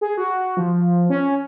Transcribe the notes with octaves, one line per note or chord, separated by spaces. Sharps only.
G#4
F#4
F3
C#4